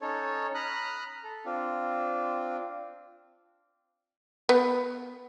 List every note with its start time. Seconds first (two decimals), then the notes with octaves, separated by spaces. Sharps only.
0.01 C#4 D#4 A4 C#5
0.55 A#5 B5 D#6 F6 F#6
1.24 A4
1.45 C4 D4 F4
4.49 B3